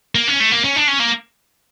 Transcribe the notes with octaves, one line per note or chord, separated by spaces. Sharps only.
A#3
C#4
A3
A#3
C#4
D4
C#4
A#3